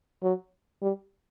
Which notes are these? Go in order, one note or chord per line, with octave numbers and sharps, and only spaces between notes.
F#3
G3